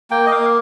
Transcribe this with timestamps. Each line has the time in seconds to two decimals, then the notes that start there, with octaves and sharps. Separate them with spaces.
0.10 A#3 G5
0.26 D#5
0.31 A#3 F5